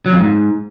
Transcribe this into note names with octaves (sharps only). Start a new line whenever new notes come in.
F#3
F2
G#2